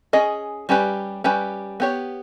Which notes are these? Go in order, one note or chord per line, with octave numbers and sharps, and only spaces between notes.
C#4 G#4 D#5
G3 C#4 G4 B4
G3 C#4 G4 B4
B3 G4 C#5